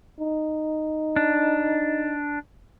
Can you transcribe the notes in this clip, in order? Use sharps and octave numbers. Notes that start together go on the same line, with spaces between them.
D#4
D4